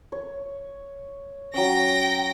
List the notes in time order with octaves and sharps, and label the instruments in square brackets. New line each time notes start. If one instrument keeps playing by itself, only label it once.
[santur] C#5
[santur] F#3 C#4 [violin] G5 A#6